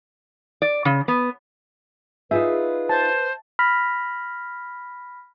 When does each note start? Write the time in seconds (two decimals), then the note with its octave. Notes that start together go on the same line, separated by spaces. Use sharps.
0.62 D5
0.85 C#3
1.08 B3
2.31 D#4 F4 G#4 B4 E5
2.89 C5 A5
3.59 B5 F6 A#6 B6